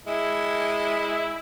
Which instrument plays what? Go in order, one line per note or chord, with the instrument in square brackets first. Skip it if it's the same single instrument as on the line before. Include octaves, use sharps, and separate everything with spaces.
[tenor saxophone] G#3 [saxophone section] E4